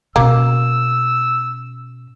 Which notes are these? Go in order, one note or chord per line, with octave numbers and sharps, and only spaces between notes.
B2 A#3 C#4 E6